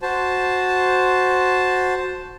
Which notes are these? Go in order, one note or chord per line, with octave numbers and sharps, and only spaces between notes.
F#4 C5 A5